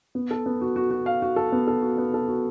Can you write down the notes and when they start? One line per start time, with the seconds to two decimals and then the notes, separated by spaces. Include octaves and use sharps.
0.15 B3
0.31 A4
0.46 B3
0.61 F#4
0.76 F#4
0.91 F#4
1.06 F5
1.22 F#4
1.36 A4
1.52 B3
1.67 A4
1.82 F#4
1.98 B3
2.14 A4
2.28 F#4